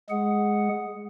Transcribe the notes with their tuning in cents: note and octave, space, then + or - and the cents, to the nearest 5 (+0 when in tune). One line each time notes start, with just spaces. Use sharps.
G#3 +0 G#4 +0 F#5 +0